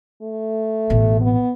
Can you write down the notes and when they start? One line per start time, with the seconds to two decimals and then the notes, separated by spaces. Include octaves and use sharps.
0.22 A3
0.90 A1 B2
1.21 B3